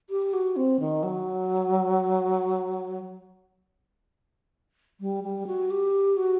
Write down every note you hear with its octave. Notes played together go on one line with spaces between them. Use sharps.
G4
F#4
C4
D#3
F#3
G3
G3
F#4
G4
F#4